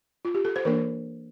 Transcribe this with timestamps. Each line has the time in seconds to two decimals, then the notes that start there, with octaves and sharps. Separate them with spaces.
0.25 F4
0.35 G4
0.45 A4
0.56 C5
0.65 E3 A#3 D4 A#4